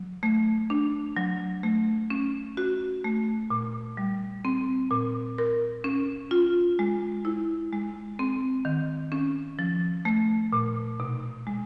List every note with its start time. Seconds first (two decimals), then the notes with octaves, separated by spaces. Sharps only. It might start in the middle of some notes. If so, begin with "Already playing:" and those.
Already playing: F#3
0.23 A3
0.70 D4
1.17 F#3
1.63 A3
2.10 C#4
2.57 F#4
3.04 A3
3.50 A#2
3.97 G3
4.45 C4
4.91 A#2
5.38 A#4
5.84 C#4
6.31 F4
6.79 G#3
7.25 E4
7.73 G#3
8.19 C4
8.65 D#3
9.12 C#4
9.59 F3
10.05 A3
10.52 A#2
11.00 B2
11.47 G#3